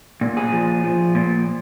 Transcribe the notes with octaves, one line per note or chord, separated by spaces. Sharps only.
A#2
G#4
F3
F3
A#2